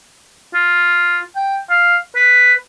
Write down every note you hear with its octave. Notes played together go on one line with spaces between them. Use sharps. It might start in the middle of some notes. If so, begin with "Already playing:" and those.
F4
G5
F5
B4